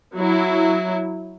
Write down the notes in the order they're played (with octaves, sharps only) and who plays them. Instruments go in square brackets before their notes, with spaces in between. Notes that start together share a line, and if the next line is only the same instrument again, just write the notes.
[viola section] F#3 E4